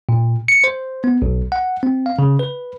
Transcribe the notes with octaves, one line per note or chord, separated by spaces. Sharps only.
A#2
C#7
C5
B3
B1
F#5
C4
F5
C#3
B4